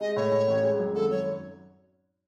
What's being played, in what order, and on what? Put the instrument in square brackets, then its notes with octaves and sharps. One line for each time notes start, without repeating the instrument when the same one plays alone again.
[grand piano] G#3 [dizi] D#5
[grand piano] A2 [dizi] C#5
[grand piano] A2
A1
G#3
F#2
[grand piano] G#1 [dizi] A4
[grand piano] F#2 [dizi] C#5